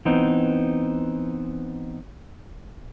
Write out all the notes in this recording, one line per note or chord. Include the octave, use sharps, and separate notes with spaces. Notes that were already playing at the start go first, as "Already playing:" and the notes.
E3 B3 C4 D#4